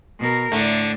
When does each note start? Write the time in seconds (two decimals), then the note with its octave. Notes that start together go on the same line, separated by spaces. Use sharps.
0.20 B2 A#4
0.52 A2 D3 A3